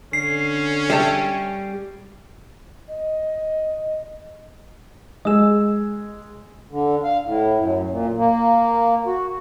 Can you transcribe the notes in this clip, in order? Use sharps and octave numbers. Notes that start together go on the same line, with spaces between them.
D3 C#4 C7
G3 E5 A5
D#5
G#3 G#4 D#5 E6
D3
F5
A2
F#2
A#2
A#3
F#4